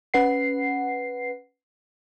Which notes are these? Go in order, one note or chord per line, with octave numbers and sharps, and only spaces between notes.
C#4 B4 F#5 C7